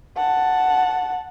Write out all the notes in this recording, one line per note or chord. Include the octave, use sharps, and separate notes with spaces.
F#5 A5